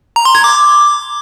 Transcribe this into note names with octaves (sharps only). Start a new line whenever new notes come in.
A#5
C6
G#6
D6